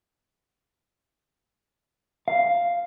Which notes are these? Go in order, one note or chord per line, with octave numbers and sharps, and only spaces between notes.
F5